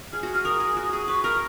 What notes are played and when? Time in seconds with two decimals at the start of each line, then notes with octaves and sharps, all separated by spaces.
0.13 G#4 F6
0.23 F#4
0.34 G#4
0.45 A#4 D#6
0.60 G#4
0.77 F#4
0.93 G#4
1.08 B4 C#6
1.24 A#4 F6